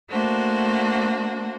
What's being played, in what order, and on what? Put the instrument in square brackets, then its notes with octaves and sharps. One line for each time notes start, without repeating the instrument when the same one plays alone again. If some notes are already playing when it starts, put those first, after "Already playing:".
[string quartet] A3 A#3 D4 F#4 C5